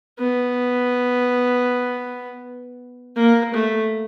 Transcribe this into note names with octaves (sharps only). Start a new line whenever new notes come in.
B3
A#3
A3